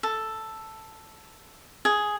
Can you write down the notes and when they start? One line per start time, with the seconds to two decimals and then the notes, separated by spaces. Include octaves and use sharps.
0.03 A4
1.85 G#4